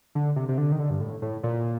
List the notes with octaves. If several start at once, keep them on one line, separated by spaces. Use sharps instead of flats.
D3
C3
C3
D3
D#3
D3
G2
A2
A2
A#2